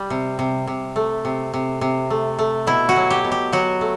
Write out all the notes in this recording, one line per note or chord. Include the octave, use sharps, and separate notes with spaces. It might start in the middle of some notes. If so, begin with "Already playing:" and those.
Already playing: G3
C3
C3
C3
A3
C3
C3
C3
A3
A3
B2 E4
F#4
F#3
G4
B2
G4
F#3 F#4
A3